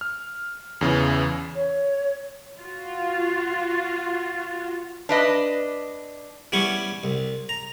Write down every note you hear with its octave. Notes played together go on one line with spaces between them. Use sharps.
F6
E2 C#3 E3
C#5
F4 F#4
D4 B4 D#5
E3 G3 B3 C#4 C#6
C2
A#5